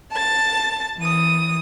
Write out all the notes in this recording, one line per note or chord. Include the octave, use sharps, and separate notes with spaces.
A5 A6
E3 D#6